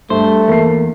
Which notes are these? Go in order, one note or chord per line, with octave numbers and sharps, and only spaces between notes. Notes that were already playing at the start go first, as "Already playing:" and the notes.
G2 A3 C5
E2 A#3 C7